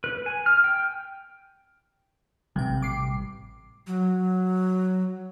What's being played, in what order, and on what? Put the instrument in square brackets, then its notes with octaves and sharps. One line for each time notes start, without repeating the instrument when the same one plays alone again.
[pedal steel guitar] B4
G#5
F6
G5
[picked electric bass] A1 G3 [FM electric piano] C3 G5
[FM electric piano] D6 C7
[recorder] F#3